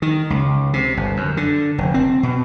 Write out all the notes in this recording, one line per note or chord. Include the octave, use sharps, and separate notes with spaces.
D#3
C#2
C3
G1
F#2
D3
F1
C4
B2